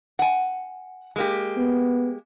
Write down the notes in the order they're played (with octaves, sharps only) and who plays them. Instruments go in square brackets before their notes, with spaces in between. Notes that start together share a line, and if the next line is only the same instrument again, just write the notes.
[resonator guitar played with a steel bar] F#5 G#5
G#3 A#3 G4
[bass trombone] B3